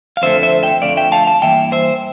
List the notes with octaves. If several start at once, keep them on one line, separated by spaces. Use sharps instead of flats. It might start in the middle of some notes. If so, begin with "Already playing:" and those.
F5
F2 D3 A3 C5 E5
C5 E5
E5 G5
F2 D3 A3 D5 F5
E5 G5
F5 A5
F5 A5
G2 E3 A#3 E5 G5
C5 E5